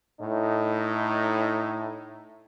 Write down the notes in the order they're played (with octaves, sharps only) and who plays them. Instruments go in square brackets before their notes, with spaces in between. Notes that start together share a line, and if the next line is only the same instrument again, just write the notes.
[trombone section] A2 D#4